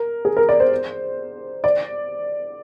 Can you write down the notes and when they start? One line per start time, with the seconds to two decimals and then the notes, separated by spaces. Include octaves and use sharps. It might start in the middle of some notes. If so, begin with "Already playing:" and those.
Already playing: A#4
0.25 G#4
0.37 A#4
0.49 D5
0.60 C5
1.64 D5